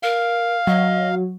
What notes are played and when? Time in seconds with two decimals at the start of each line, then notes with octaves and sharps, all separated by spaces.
0.03 A#4 F5
0.67 F#3 D#5